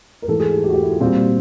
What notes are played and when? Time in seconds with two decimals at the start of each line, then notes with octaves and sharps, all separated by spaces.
0.22 A#4
0.28 G#2 E3 A3 A4
0.40 G#4
0.52 G4
0.64 G4
0.69 F#4
0.74 G4
0.83 E4
0.92 F4
1.01 A#2 G3 C4 F#4